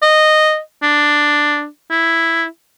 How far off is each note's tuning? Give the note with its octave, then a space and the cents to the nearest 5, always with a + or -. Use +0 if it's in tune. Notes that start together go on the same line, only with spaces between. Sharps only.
D#5 -10
D4 +5
E4 +5